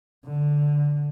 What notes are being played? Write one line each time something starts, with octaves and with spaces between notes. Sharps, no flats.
D3